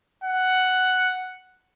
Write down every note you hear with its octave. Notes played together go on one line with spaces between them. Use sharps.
F#5